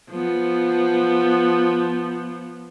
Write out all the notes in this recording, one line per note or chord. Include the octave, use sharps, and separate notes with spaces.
F3 B3